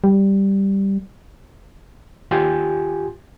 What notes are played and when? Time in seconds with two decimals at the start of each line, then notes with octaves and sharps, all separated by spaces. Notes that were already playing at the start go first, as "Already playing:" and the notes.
0.04 G3
2.31 D#2 F4 G4 G#5 C6 G6